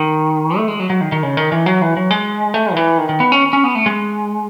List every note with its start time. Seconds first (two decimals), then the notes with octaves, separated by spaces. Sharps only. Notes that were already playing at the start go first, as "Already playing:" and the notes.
Already playing: D#3
0.57 A3
0.68 G#3
0.80 F#3
0.90 F#3
1.01 D#3
1.12 D#3
1.23 C#3
1.37 D#3
1.52 E3
1.66 F#3
1.82 E3
1.97 F#3
2.11 G#3
2.54 A3
2.73 D#3
2.76 E3
2.98 D#3
3.09 D#3
3.20 B3
3.32 C#4
3.53 C#4
3.64 B3
3.75 A3
3.86 G#3